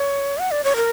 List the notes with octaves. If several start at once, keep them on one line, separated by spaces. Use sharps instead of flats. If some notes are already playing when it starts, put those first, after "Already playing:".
Already playing: C#5
F#5
D5
C#5
A#4